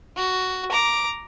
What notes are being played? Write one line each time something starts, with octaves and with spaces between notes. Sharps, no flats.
F#4
A#5 D6